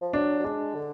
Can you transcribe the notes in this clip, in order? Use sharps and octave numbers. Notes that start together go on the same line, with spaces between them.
F3
F#3 D4
F#3
G#3 D4
D3